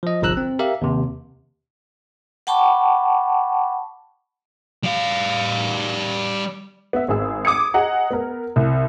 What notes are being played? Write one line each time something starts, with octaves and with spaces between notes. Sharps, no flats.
F3 D#5
G1 C2 F3 A#5 E6 F#6
C4
G4 A#4 E5 F5
D#2 C3
F#5 G5 A5 B5 C#6 D6
G3 F5
B3 E5
G#1 G#4 E6
D6 D#6 G#6 C#7
G#4 D#5 F#5 A#5
B3 A#4
C2